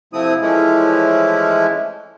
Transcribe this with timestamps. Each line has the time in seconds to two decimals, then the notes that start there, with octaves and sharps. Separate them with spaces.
0.13 C3 F3 A3 C4 E4 D#6
0.41 E3 F3 G#3 A3 C#4 E4